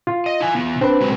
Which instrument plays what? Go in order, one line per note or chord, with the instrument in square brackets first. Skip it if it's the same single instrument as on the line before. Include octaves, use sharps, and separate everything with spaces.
[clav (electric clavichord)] F4
[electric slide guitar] D#5
E4 G#5
E3 G3 B3
[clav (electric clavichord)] C4 B4 [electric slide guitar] D4
[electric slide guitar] F#3 G#3 F#4